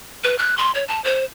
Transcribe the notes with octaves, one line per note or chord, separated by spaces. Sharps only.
B4
F#6
C6
C#5
A5
C5